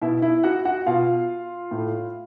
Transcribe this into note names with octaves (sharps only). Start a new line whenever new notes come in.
B2 E4 E5
E4 E5
F#4 F#5
F#4 F#5
B2 F4 F5
A2